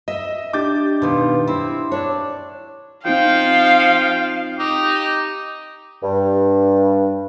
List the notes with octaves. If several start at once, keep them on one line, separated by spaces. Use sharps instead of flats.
D#5 E5
D4 G4 D6 G6 A6
B2 D#3 F4
C4 E4
D4 C#5
F3 C4 D#4 F4 F5 G5
D#4 G4
G2